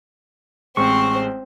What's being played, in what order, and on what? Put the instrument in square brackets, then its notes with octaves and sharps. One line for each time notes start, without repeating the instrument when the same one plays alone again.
[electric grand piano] A1 G#3 [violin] C4 C5 [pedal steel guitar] C#6